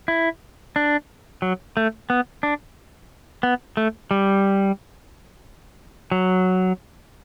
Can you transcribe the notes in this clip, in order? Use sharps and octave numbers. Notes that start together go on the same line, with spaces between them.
E4
D4
F#3
A3
B3
D4
B3
A3
G3
F#3